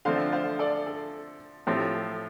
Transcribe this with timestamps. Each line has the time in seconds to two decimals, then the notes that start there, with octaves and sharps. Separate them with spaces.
0.05 D3 F3 A3 C4 C5 F5
0.32 C5 F5
0.59 A4 D5
0.86 A4
1.67 A2 F3 C4 G4
1.95 A4